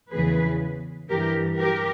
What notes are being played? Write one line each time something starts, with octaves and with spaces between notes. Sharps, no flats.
E2 C#3 E3 G#4 B4
G2 E3 G4 A#4
G4 A#4